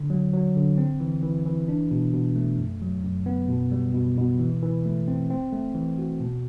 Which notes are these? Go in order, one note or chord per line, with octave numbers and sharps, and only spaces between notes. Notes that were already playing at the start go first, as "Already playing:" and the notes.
Already playing: D3
F#3
F#3
D3
C4
E3
E3
E3
D4
B2
B2
A3
F#2
F#3
F#2
B3
B2
G3
B2
B2
E3
E3
A3
C4
C4
A3
E3
F#4
B2